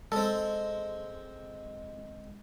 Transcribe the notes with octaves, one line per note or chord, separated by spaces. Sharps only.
G#3 C4 A4